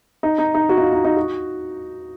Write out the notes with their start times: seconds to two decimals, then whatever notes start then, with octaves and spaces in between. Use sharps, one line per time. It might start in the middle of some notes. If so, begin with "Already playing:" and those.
0.23 D#4
0.38 D#4
0.55 D#4
0.69 F#4
0.78 D#4
0.81 F4
0.93 D#4
1.04 D#4
1.17 F#4